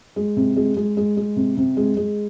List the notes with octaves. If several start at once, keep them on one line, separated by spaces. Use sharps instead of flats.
G#3
C3
G#3
G#3
G#3
G#3
C3
C3
G#3
G#3